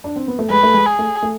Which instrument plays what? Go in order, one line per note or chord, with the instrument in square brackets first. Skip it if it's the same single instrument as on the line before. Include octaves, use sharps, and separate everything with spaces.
[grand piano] D4
C4
B3
A3
[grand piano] G#3 [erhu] B4
[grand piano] A3
G#3
[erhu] G#4
[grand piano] A3
A3